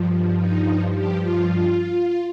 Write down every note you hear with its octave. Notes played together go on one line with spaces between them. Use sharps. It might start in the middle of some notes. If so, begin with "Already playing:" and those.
Already playing: G2 F3
D#4
G4
F4